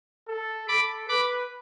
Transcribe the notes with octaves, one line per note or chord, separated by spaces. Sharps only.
A4
A4 B5 D6
B4 B5 D6